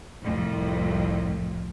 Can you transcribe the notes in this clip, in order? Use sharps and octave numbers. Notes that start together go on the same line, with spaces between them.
C2 F2 A2